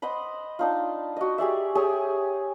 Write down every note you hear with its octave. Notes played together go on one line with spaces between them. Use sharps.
C5 D#5 F#5 B5
D4 D#4 F4
F#4 D#5
G4 G#4 D5 E5
G4 G#4 C#5